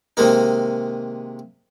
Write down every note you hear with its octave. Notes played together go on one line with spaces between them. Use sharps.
C3 D#3 G#3 A#3 D#4